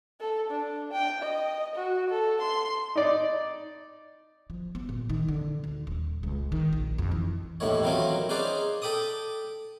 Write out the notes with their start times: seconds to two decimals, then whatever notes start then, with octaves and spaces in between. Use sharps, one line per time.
0.20 A4
0.50 D4
0.92 G5
1.22 D#5
1.75 F#4
2.10 A4
2.41 C6
2.96 D#4 D5
4.50 F3
4.75 B3
4.89 A#2
5.10 D#3
5.28 D3
5.64 D2
5.87 D#1
6.23 C#2
6.52 D#3
6.73 A#1
6.98 F2
7.12 E3
7.60 A1 D#2 A2 D#3 C#5
7.83 D#3 E3 F#3 C4 C#4 F4
8.29 C#4 D#4 G#4 B4 C5 D5
8.82 A4 G5 B5 D6 D#6